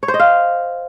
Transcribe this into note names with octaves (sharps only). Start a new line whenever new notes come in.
C#5
C5
D#5
F5